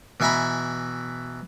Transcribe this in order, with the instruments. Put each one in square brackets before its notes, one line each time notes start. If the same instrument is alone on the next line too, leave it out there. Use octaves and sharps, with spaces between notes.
[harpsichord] B2 E3 E5 G#5 A#5 B5